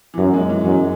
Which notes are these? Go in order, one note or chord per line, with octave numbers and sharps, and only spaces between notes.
E3
F#2 F#3
G#3
E3
F#2 G#3